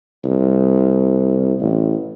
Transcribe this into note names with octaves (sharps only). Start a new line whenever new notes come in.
C2
A1